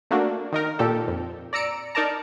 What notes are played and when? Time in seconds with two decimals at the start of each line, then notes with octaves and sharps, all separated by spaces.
0.11 A3 A#3 D4 F#4
0.52 D#3 D#4 A#4
0.79 A#2 G4 A4
1.08 F2
1.53 D5 A#5 E6 C#7 D7
1.95 D#4 A#4 D5 A5 A#5